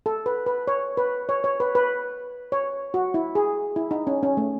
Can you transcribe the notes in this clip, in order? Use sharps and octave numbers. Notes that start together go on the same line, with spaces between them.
A4
B4
B4
C#5
B4
C#5
C#5
B4
B4
C#5
F#4
E4
G#4
E4
D#4
C#4
C#4
A3